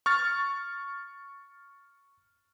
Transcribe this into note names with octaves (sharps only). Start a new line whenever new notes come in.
C#6 F6 A6